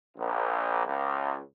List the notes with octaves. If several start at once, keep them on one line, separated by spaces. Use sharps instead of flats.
A#1
C#2